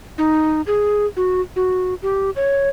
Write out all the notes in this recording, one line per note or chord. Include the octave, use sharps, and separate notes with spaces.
D#4
G#4
F#4
F#4
G4
C#5